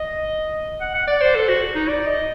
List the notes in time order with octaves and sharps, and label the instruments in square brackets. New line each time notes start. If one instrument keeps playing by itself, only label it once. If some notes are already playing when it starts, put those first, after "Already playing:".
Already playing: [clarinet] D#5
F#5
F#5
D5
C5
A4
F#4
D#4
D5
D#5